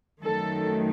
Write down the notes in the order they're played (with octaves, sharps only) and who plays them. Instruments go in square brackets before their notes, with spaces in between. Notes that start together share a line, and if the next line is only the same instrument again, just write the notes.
[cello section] F#2 D#3 F#3 A3 A4